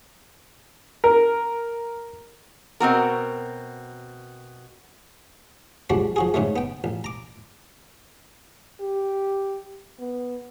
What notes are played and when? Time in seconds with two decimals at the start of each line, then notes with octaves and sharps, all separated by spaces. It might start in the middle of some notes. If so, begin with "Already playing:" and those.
1.04 A#4
2.80 B2 C4 F#4 A#4
5.90 F3 G3 G#3 D4 F#4
6.16 F3 F#4 G#4
6.34 G#2 C#3 G#3 A3
6.56 B3 G5
6.84 A1
7.04 A#5 D6
8.80 G4
9.99 B3